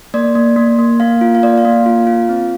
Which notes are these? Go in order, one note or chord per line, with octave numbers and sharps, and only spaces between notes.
A#3 D5
A#3
A#3
A#3
A#3 F5
F4
F5
A#3 D5
F5
A#3
F5
F4
F4
C4